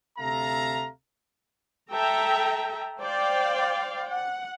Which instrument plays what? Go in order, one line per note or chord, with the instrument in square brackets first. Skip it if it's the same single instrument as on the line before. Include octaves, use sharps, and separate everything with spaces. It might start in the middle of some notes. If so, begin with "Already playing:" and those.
[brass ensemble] D2 C3 A4 E5 F5 A#5
[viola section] A4 E5 G5 A#5
C5 D5 F5 G5
F#5